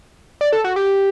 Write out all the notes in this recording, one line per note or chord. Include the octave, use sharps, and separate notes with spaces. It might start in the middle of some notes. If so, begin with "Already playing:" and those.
D5
A4
F#4
G4